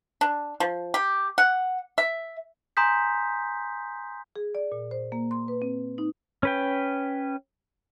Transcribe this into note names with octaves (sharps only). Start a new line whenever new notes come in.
D4
F3
G4
F#5
E5
G#5 A#5 C6 D#6 G6 B6
G#4
D5
A#2
C5
A#3
C6
B4
C4
D#4
C#4 B4 G5